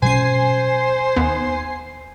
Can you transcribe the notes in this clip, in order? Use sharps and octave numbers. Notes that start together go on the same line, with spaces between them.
B2 F#3 C#4 C5 G#5 C7
D#2 B3